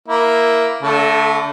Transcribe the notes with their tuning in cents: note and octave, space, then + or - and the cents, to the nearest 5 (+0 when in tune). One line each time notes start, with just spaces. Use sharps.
A#3 +0 E4 +0
D3 -35 A3 +0 A5 +0